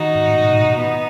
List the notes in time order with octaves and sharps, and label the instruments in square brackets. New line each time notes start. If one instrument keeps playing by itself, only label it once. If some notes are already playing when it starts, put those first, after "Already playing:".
Already playing: [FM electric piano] D#3 [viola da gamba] D#4 F#4
[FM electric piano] G#2
A2
B2
A2
A2
[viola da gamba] B3 D#4